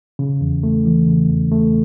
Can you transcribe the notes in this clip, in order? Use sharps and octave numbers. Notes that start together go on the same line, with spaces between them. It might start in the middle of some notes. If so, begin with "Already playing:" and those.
C#3
E2
A3
E3
C#3
E2
A3